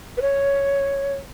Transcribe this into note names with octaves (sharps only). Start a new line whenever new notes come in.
B4
C#5